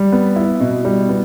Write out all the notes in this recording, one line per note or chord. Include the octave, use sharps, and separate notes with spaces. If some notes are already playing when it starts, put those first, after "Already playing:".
Already playing: G3
B3
E4
B2
G3
B3